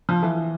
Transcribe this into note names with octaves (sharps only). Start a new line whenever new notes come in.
F3
E3